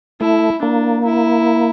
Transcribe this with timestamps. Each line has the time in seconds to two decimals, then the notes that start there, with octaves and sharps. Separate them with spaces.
0.20 A3 E4
0.62 A#3 D4
1.04 E4